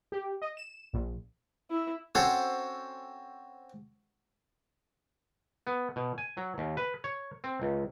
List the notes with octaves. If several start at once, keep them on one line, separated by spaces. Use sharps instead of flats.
G4
D#5
E7
A#1
E4
C4 C#4 F#4 A4 C5 C#5
B3
B2
G#5
F#3
D#2
B4
C#5
C4
C#2